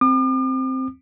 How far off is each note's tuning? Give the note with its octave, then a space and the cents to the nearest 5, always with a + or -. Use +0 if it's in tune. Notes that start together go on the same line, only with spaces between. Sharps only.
C4 +0 D6 +45